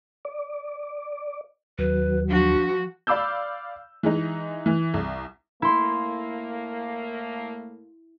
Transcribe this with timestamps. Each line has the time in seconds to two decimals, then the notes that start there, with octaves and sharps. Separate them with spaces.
0.25 D5
1.78 D#2 F#3 B4
2.29 F3 D4 F#4
3.07 D5 F5 B5 D6 E6 G6
4.03 E3 G#3 D#4
4.66 E3
4.94 C2
5.62 A2 A3 A#3 E4 C6